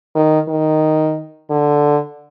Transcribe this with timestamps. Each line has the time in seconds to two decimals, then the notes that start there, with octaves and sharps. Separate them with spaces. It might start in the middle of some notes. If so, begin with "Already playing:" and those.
0.15 D#3
0.48 D#3
1.50 D3